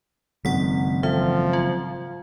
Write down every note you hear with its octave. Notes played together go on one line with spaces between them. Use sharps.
G#1 C#3 F#3 C#4 F#5 B6
E3 F3 E5
F4